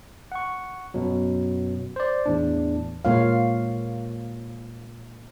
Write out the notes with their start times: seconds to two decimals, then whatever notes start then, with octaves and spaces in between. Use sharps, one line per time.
0.32 F#5 C#6
0.94 F#2 B2 F#3
1.96 C5 D5
2.26 E2 A2 D4
3.05 A#2 G#3 A#3 F4 C#5 F5